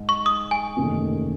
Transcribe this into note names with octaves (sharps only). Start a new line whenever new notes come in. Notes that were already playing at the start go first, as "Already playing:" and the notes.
Already playing: G#2
C#6
D#6
G#5
F#1 E2 C3 D#3 A3